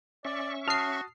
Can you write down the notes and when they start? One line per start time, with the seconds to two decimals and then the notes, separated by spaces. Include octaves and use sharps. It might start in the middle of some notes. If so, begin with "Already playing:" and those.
0.25 C#4 D5 E5 C#6
0.68 F#4 A5 D#6 F6 C7